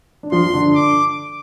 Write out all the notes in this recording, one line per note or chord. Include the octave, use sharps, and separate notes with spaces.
D4
F3 F4 C6
D3 D4
D6